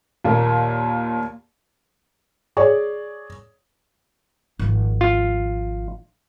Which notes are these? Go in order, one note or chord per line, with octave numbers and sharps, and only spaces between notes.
D#2 A#2 A#3
G#4 C#5 D5
G#1 F3
F4